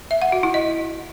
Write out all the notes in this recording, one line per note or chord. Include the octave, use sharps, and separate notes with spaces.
E5
F#5
F#4
E4
D#5